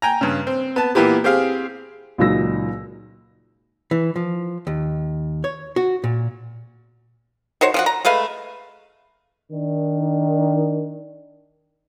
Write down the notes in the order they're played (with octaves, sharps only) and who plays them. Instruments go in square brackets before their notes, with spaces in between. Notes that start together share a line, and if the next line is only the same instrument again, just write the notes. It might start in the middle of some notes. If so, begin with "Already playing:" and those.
[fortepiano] G5 G#5 A#5
G2 C#3
C4
B3 A5
A#2 E3 A#3 B3 E4 G4
C4 G4 G#4 F5
[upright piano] C#2 A#2 F#3 D#4 E6 A#6
[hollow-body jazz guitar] E3
F3
D#2
C#5
F#4
A#2
[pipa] D#3 F#4 C5 C#5
F3 C#4 F#4
A#5
G#3 A3 B4 F5
[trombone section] D#3 D4